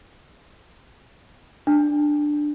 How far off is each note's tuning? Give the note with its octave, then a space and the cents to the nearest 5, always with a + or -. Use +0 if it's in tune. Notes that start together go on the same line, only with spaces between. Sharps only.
D4 +10